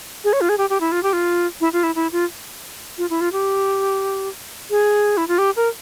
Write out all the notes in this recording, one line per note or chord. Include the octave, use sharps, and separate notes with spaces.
G#4
C#5
F4
G#4
G4
G4
E4
F4
G4
F4
E4
F4
E4
E4
F4
F4
E4
F4
G4
G#4
E4
F4
G4
A#4